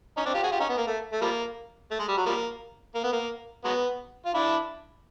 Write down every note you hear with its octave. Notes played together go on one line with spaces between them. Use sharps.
C#4 D#4
C4 D4
F4 G4
F#4 G#4
F4 G4
C#4 D#4
B3
A#3
A3
A3
F3 G3 A#3
A3
G#3
G3
F#3
F3 G3 A#3
A#3
B3
A#3
F#3 G#3 B3
F4
D4 E4